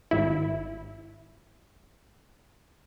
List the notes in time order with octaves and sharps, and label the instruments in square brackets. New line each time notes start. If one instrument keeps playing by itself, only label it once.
[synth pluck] G#1 E4